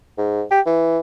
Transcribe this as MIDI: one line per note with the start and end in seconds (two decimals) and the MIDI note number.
0.18 0.43 44
0.51 0.60 67
0.66 0.99 52